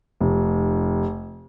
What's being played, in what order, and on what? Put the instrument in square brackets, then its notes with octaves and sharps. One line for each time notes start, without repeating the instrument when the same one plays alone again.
[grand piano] F1